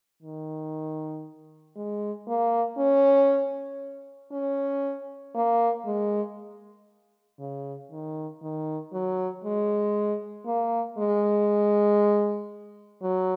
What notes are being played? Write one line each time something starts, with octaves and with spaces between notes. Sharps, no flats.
D#3
G#3
A#3
C#4
C#4
A#3
G#3
C#3
D#3
D#3
F#3
G#3
A#3
G#3
F#3